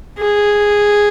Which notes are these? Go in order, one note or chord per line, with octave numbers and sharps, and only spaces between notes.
G#4